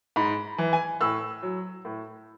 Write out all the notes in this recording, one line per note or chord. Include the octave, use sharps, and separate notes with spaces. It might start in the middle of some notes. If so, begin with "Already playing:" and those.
G#2 B5
E3
G#5
A2 E6
F#3
A2